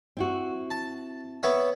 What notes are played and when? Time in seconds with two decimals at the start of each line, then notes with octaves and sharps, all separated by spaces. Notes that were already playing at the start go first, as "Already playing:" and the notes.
0.17 C4 E4 F#4
0.71 A5
1.43 B3 C#5 E5